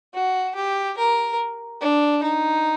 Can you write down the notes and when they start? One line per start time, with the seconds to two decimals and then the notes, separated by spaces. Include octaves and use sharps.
0.14 F#4
0.55 G4
0.98 A#4
1.81 D4
2.22 D#4